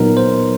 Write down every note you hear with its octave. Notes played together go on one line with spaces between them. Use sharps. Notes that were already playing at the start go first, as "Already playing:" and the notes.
Already playing: A#2 F#3 B3 D#4 A#4
C5